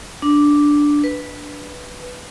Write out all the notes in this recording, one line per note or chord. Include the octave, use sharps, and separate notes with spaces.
D4
B4